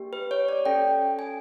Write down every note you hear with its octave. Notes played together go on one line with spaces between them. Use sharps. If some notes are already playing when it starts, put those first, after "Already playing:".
Already playing: A#3 D4 G4
B4
C#5
D5
C#4 F#4 A4 G5
G#5